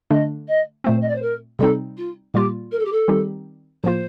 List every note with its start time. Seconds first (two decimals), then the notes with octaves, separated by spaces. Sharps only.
0.10 D3 A3 D4 D#5
0.48 D#5
0.84 A#2 A3 C4 C5
1.01 D#5
1.08 D5
1.15 C5
1.22 A#4
1.59 C3 G3 C4 D#4 A4
1.97 F4
2.34 A#2 G3 A#3 F4 G4
2.71 A#4
2.79 A4
2.85 G4
2.92 A4
3.08 D#3 G3 C4 D#4 G4
3.84 A2 F3 A#3 F4 C5